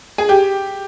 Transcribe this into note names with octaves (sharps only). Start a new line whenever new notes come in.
G#4
G4